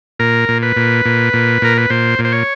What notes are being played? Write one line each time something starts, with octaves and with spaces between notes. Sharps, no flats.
A#2 A#4
A#2
B4
A#2
A#2
A#2
A#2 A#4
B4
A#2 C5
A#2
C5
C#5